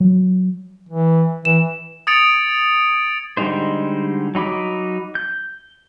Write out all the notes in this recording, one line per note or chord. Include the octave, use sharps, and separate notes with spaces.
F#3
E3
E3 E7
D#6 G#6 A6 C#7 D7 F7
D3 G3 G#3 D#4 C5
F#3 D#4 B5 D6
G6